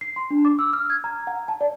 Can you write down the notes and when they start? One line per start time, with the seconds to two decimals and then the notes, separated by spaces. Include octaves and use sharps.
0.01 C7
0.16 C6
0.31 D4
0.45 D6
0.59 E6
0.73 F6
0.90 G#6
1.04 A#5
1.27 F#5
1.48 A5
1.61 D5